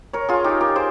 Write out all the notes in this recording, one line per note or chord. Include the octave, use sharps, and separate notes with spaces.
A#4 C#5
F4 G#4
D#4 G4
G4 A#4
G#4 C5